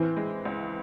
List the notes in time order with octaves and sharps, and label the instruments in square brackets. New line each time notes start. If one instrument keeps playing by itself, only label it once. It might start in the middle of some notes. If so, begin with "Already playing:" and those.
Already playing: [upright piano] E3 [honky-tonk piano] C4
[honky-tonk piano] G#3
C#2